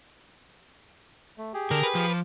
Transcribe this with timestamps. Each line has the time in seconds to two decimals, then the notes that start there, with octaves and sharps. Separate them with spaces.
1.38 A3
1.54 G4 G#4
1.71 D3 A#4
1.83 B4
1.95 F3
2.07 D6 F6